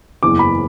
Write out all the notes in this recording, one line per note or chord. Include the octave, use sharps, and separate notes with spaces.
F#1 E2 E3 D6
B5